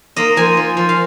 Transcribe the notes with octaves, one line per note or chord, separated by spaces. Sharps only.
A#3 D#5
F3 G#5
F3
F3
F5